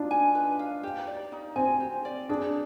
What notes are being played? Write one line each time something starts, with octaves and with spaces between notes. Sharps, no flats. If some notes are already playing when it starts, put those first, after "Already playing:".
Already playing: D4 D#4 F4
G#5
B4
F5
G4
D5
D#4
C4 G#5
G4
D5
D4 G#4